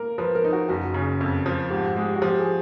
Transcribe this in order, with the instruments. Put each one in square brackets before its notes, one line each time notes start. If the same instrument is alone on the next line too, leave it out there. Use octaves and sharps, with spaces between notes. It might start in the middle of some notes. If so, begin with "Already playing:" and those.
Already playing: [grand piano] A#3 [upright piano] A#4
[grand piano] F3 [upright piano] B4
[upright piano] A#4
[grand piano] D#4
[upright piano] F#4
[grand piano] F#1 [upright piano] F#4
[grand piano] C#3
F2
F3
[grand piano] G#2 [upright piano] G4
[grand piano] G#3 [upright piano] G4
[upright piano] F#4
[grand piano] F3 [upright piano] G4
[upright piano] G#4